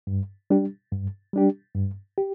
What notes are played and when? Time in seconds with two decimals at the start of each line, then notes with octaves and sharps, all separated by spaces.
0.07 G2
0.50 G3 D4 G4
0.92 G2
1.33 G3 D4 G4
1.75 G2
2.18 G4